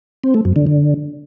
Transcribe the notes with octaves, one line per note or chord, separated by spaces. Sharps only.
C4
A3
F#2
D3
D3